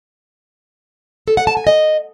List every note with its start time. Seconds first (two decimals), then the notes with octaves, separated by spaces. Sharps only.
1.28 A4
1.37 F#5
1.47 A5
1.57 G#5
1.67 D#5